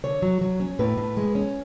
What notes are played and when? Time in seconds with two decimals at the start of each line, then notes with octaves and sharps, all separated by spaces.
0.04 D3 C#5
0.22 F#3
0.41 F#3
0.60 C#4
0.79 A2 B4
0.97 A2
1.17 G#3
1.35 C#4